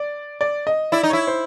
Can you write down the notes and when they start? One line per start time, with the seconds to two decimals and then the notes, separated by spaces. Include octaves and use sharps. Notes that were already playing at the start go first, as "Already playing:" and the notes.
Already playing: D5
0.41 D5
0.67 D#5
0.92 E4 D5
1.03 D#4
1.10 E4 C#5
1.27 C5